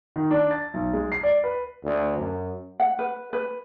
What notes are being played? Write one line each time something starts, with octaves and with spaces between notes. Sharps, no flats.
D#3
D4
A6
B1
G#3
C7
D5
B4
D2
F#2
F#5
B4
B4